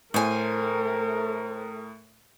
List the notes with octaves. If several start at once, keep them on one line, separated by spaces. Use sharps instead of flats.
A2 A3 A#4 C5 G#5